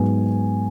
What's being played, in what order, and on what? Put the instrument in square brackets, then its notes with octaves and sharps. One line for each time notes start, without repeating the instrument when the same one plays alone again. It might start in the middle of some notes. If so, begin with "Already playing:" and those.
Already playing: [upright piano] G#2 F#3 B3 G#5